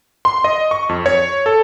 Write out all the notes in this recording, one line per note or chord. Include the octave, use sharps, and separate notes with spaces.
C6
D#5
C#6
F2
C#5
A4